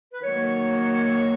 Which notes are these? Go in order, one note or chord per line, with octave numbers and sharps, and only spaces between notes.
B4
D#3 F#3 A#3 C#5